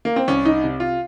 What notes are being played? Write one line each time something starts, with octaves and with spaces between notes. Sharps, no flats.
A#3
C4
C2 C#4
D#4
C3
F4